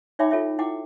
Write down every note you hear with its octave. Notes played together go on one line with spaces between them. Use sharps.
D#4 C#5 E5 G5 B5 D6
F4 A4 C#5 E5
E4 F#5 G5 D6